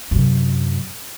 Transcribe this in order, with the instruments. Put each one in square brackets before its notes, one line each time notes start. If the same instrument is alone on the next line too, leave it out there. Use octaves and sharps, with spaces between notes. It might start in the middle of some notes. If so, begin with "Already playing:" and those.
[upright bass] F#2 C3